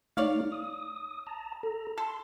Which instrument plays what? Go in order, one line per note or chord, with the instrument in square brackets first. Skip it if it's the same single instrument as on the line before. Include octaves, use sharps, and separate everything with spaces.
[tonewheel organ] A3 D#4 [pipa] C#5 D5 F5
[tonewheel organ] D#6
A5 A#5
A4 A#5
[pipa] A4 [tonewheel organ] C6